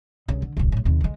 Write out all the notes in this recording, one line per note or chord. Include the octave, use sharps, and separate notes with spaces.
C2 C#3
D3
D1 C2
A#1 A2
D#2 C3
D2 G#3